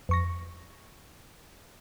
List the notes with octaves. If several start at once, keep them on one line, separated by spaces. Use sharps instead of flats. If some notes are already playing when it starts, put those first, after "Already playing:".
F2 C#6 A#6